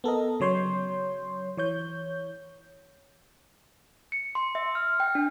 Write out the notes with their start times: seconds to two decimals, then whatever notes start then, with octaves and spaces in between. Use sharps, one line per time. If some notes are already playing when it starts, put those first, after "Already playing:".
0.04 B3 A4 A#4 D#5
0.40 C#3 F#3 C#5 C6 G6
1.57 E3 C#5 G6
4.12 C#7
4.35 C6
4.55 E5
4.75 F6
5.00 G5
5.15 D4